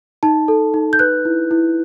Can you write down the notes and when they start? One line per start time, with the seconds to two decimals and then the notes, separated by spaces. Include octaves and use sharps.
0.23 D#4 A5
0.48 A4
0.74 D#4
0.93 G6
0.99 B4 F#6
1.25 E4
1.51 E4